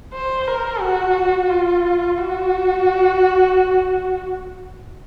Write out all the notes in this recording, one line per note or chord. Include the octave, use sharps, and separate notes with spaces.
C5
A#4
F#4
F4
F#4